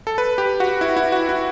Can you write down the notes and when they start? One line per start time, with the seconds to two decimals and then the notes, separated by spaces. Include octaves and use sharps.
0.07 A4
0.18 B4
0.38 G4
0.60 F#4
0.81 E4
0.96 E4
1.12 F#4
1.29 E4